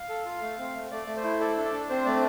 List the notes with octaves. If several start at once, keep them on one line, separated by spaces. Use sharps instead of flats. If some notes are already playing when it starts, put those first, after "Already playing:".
Already playing: F5
A4
F4
A3
C4
A3
A3 D5
A3
C5
E4
A4 D5
D4
D5
D4
C4 C5
A3 D5